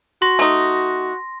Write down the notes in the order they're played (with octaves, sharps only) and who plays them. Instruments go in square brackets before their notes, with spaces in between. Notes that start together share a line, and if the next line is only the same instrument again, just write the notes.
[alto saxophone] F#4 [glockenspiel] C6 A#6
[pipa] A3 D#4